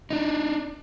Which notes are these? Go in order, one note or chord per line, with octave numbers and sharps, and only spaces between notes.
D4 D#4